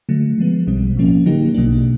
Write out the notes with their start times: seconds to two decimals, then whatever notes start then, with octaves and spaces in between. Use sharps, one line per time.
0.09 D3 F#3 A3
0.38 F3 G#3 B3
0.67 B1 B2 G3 C4
0.96 A#1 A2 F3 A#3 C#4
1.26 D3 F#3 A#3 D#4 G4
1.54 B1 B2 F#3 A#3 D4